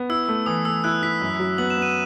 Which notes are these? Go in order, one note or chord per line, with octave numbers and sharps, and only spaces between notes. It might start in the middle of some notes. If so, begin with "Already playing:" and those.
Already playing: B3
E4 E6
A3
E3 D#6
A3 E6
E4 F#6
E4 B6
F#2
F#3
B3 F#7
E7
B3
D#7